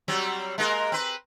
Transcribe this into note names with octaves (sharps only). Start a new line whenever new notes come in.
F#3 G3 C4
G#3 A#3 A#4
C4 B4